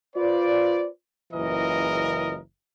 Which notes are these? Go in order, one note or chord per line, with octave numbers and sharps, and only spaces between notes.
F4 B4 C5 D5
F#1 C#2 A#2 E3 A#4 D#5